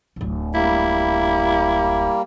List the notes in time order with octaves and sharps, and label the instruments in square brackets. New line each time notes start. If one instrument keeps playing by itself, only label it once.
[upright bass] D1 A1
[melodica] G3 A#3 [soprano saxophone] E4